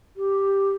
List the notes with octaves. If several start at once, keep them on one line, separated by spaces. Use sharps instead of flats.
G4